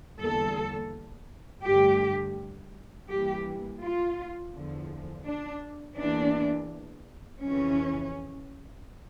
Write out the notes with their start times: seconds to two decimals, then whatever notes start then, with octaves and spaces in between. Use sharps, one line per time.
0.20 E2 D3 G3 A#3 A4
1.64 G2 D3 A3 G4
3.09 G2 E3 A#3 G4
3.81 F4
4.53 E2 D3 F3
5.26 D4
5.98 E2 E3 A#3 D4
7.43 F2 C#3 E3 C#4